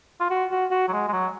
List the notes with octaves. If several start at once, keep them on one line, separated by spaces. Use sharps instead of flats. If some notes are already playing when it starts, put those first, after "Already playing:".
F4
F#4
F#4
F#4
F#3
G#3
G#3
F#3